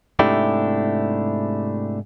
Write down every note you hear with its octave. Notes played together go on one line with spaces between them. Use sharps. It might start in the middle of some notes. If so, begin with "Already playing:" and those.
G#2 C3 A3 D4 E4 G4